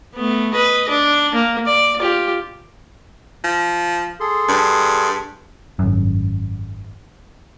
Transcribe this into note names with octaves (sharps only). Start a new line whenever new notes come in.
A3 B3
B4 D#5
D4
A#3
D5
F4 G4
F3
G#4 A4 C6
G2
G#1 F#2